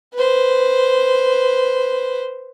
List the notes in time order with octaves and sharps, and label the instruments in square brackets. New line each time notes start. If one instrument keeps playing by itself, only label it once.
[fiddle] B4 C5